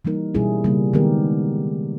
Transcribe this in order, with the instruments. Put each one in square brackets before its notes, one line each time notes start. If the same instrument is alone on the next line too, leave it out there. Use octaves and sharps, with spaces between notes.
[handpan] E3 G3 A#3 D#4 A#4
B2 G3 C#4 E4 G#4
C#3 G3 A#3
D#3 G#3 B3 G4 A#4